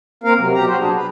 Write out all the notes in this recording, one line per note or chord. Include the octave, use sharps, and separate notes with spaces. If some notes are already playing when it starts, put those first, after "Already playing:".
A#3 C4 A#4 F5
C3 F#3
B2 G4 A#5
F#3 F#4 C5
D4 G#4
B4